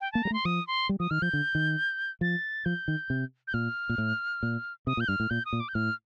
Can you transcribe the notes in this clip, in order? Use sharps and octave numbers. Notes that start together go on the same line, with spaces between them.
G5
A#3 A5
G3 A#5
A3
C6
F3 D#6
C6
G3
F3 D#6
D#3 F6
F3 G6
D3
D#3
F3 A6
F3 G6
D#3
C3
G6
A#2 F6
A#2
A2
A#2
C3 D#6
A#2
G6
G2 F6
A2
A#2 G6
D#6
A#2
D6
G6
A2 F6